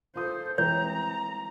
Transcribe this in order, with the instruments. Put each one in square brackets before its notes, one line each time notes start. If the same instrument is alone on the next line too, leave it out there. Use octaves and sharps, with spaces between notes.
[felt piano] F4 D#6 [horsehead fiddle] A4 C5
[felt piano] E3 G#3 C4 [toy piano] C#5 [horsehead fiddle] A#5